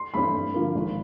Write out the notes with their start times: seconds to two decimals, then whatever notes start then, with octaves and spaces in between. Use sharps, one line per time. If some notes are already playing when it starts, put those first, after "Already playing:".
Already playing: C6
0.14 G2 E3 A3 C4 B5
0.34 G2
0.54 D3 F3 A#3
0.75 G#1